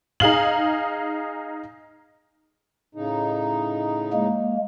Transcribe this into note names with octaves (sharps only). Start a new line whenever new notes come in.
D#4 G#4 F5 F#7
A2 C#3 D#4
G#3 A#3